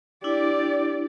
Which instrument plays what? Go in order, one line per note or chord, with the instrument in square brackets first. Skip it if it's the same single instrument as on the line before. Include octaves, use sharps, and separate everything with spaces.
[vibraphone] D4 E4 [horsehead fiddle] G4 D5